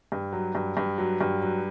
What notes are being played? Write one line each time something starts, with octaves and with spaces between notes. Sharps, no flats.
G2
F#3
G2
G2
F#3
G2
F#3